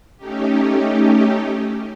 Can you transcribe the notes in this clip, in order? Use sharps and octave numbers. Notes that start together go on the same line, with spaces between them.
A3 C#4 D#4 G4